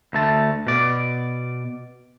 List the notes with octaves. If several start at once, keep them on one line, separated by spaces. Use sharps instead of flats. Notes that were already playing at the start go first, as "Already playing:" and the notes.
D2 A3 A5
B2 D5